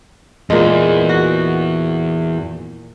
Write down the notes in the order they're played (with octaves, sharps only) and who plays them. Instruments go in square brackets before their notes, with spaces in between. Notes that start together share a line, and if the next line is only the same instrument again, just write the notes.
[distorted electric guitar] E2 [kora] A#2 G#3
[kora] F#4